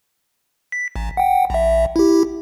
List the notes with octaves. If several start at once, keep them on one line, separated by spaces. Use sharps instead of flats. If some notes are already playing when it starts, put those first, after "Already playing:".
B6
A1
F#5 G5
A#1 E5
E4 G4